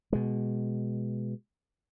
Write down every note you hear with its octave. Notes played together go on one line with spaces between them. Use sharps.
B2 G#3